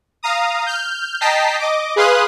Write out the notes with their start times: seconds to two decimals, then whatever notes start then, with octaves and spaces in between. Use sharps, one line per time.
0.23 F5 A#5 D#6
0.66 F6 G6
1.21 D#5 G5 A5 A#5 B6 C7
1.59 D#5 D6
1.96 G#4 B4 F5 C6 D#6 F#6